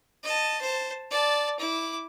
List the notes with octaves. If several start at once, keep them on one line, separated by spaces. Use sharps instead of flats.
D#5 A5
C5 A5
D5 A5
E4 D6